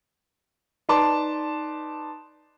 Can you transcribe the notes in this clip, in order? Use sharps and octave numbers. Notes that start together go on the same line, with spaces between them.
D#4 B4 D5 A5 C6 D6